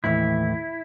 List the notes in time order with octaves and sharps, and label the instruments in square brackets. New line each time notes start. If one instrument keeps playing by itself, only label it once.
[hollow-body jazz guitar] D#2 A2 E3 [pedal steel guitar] E4